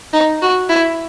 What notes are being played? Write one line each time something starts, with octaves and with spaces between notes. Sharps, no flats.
D#4
F#4
E4